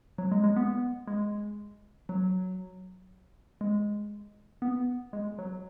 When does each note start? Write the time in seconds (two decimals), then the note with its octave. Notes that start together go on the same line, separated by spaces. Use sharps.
0.18 F#3
0.31 G#3
0.44 G#3
0.56 B3
1.07 G#3
2.09 F#3
3.61 G#3
4.62 B3
5.13 G#3
5.38 F#3